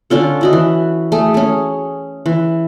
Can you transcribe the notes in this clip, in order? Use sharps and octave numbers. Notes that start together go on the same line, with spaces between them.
D3 C#4 F4 A4
E4 F#4 D#5
E3
A3 G#4
C#4 G#4
E3